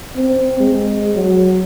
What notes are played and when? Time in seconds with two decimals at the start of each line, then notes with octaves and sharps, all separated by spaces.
0.16 C4
0.60 G#3
1.16 F#3